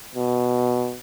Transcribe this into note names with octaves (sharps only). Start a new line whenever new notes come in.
B2